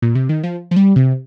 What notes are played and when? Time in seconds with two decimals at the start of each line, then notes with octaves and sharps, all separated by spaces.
0.02 A#2
0.15 C3
0.29 D#3
0.44 F3
0.71 F3
0.76 G3
0.96 C3